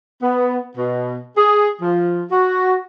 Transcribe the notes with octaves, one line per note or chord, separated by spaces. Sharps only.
B3
B2
G#4
F3
F#4